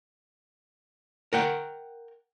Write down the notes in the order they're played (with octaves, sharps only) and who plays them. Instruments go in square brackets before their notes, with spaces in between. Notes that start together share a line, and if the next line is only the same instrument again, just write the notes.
[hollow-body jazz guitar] A#4 F#5 G5